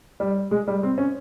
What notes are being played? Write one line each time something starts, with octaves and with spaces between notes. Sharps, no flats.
G3
G#3
G3
C4
C#4